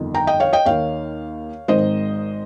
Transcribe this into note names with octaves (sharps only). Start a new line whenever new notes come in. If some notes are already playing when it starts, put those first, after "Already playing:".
Already playing: G1 F2 D#3
G5 A#5
D#5 G5
C#5 F5
D#5 G5
D#2 D#3 C#5 F5
G#1 G#2 D#3 C5 D#5